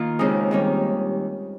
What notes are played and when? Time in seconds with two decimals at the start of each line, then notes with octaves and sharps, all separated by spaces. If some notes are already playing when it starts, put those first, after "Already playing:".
Already playing: D#3 A#3 F4
0.19 D#2 C#3 G#3 C4 D#4
0.51 D#3 G3 C#4